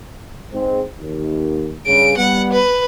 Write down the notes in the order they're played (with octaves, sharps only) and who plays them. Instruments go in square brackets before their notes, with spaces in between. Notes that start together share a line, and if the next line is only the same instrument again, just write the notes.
[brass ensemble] G#2 G#3 C4
D#2
[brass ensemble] G2 C#3 [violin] D7
[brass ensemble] G3 B3 [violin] F#5
[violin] B4